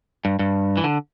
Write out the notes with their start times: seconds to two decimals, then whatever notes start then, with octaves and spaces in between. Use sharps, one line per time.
0.25 G2
0.39 G2
0.77 E3
0.84 D3